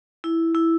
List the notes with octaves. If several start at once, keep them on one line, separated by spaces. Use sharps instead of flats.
E4
E4